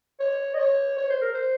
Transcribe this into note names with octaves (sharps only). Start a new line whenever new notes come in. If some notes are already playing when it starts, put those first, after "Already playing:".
C#5
D#5
C#5
C#5
C5
A#4
C5